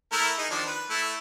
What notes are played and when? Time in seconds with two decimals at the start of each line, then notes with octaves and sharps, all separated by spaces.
0.12 A3 E4 A#4
0.38 D#4 G#4
0.51 D#3 F3 D4
0.66 B4
0.90 A3 E4